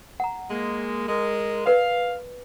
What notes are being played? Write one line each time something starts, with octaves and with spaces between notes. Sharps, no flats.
F#5 A#5
G#3 A#3
G#3 A#4
A#4 B4 D5 F5